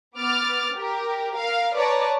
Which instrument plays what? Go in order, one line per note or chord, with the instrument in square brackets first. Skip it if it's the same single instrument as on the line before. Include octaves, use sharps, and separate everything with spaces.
[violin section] B3 D6 F6 A6
G4 A#4
A#4 F5
B4 C#5 D5 A5 A#5